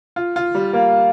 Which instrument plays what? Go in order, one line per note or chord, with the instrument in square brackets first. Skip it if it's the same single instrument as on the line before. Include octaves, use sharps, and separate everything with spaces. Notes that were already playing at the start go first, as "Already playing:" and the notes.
[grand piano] F4
F4
G3
[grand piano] A#3 [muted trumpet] F5